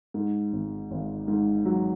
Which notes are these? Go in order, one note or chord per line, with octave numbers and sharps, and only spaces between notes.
G#2
G#1
G#1
G#2
F#3